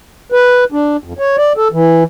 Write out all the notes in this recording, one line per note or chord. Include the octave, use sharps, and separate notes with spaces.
B4
D4
F2
C#5
D5
A4
E3